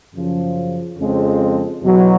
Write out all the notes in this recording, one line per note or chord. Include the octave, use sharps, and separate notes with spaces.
F#2 C#3 F3
F2 C#3 F3 G#3 C4
E2 B2 F#3 B3